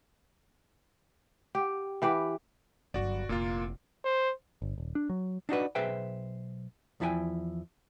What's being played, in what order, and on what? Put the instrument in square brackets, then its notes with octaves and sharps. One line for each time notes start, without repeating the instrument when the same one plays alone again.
[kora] G4
E3 G4 B4
[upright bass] G1 F#3 [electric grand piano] F#4 D5
[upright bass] F1 E4 [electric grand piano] A#2 A#3 F4
[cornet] C5
[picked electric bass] G1
D#1
D4
F#3
[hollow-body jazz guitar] D4 D#4 F#4 B4
B1 G#4 B4 C5 E5 G5
E2 F3 E4 A4 G5 G#5